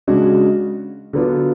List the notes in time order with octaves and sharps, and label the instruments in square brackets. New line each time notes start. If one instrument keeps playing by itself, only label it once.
[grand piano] C#3 G#3 D4 F#4
D3 F#3 B3 D4 F4